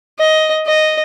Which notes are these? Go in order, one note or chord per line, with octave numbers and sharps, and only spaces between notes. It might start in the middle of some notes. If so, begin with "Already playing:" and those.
D#5
D#5